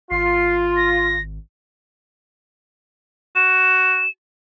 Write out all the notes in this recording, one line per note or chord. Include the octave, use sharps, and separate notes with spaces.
G#1 F4 C7
A#6
F#4 E7